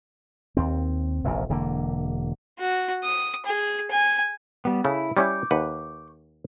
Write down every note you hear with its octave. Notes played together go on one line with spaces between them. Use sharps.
D#2 C4
F1 A#1 E2
E1 D3 A#3
F#4
D#6
G#4
G#5
G3 B3
C#3 E4 A4
G3 C#4 E4 C#6 D6 G6
D#2 B4 F#5